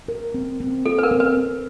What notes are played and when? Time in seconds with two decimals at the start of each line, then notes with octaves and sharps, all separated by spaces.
0.08 A#4
0.34 C4
0.60 C4
0.86 F4 A4
0.98 B4
1.03 A#4
1.11 C4
1.20 B4
1.37 C4